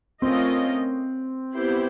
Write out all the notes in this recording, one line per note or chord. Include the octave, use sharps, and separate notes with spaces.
A3 C4 C#4 F4 A#4 D#5
B3 E4 G4 C5